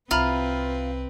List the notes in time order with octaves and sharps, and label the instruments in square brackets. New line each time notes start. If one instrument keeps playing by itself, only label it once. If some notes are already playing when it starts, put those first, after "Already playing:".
[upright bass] C2 [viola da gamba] C4 B4 [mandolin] F4 [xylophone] E5 A#5 B5